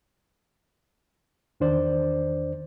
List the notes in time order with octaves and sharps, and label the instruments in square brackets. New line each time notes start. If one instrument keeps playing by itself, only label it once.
[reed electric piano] E2 D#3 D4 C5 D5